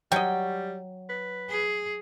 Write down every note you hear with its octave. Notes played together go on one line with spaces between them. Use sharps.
F#3 G3 D#5 G5
B4
G#4